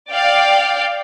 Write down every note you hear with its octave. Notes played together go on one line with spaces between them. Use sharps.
D5 F5 G5